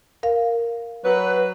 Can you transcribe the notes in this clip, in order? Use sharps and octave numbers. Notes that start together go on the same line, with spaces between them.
A#4 F5
F#3 B4